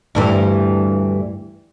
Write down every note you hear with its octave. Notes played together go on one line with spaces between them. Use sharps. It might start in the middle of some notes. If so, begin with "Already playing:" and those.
D2 G2 E3